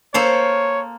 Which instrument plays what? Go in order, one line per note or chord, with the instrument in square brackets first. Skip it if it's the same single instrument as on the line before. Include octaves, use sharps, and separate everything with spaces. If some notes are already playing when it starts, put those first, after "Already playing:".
[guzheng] A#3 A4 C5 [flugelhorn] C#5